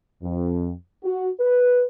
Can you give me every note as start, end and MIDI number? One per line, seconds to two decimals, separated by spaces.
0.22 0.72 41
1.04 1.29 66
1.40 1.84 71